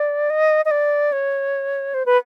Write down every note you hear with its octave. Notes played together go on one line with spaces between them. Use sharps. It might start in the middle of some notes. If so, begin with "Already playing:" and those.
Already playing: D5
D#5
D#5
D5
C#5
C5
B4